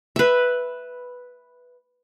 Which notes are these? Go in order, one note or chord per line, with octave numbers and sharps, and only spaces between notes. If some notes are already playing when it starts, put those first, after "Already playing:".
B4 E5